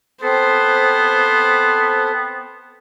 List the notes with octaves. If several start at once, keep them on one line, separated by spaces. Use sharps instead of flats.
B3 C4 A4 C5